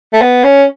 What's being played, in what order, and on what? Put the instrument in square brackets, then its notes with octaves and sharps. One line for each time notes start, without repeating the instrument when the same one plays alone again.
[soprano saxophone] A3
B3
C#4